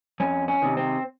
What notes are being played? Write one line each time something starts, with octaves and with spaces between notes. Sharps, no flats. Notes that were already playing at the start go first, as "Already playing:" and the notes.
F2 C#4
C#4
C3 D#3
C4